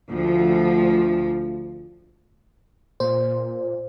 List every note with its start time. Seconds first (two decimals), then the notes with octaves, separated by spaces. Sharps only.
0.10 D2 F3
3.00 A#2 C5